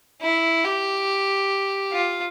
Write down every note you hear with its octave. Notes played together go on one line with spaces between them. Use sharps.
E4
G4
F4